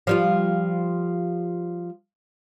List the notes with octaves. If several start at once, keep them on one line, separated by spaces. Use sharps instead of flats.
F3 G3 F4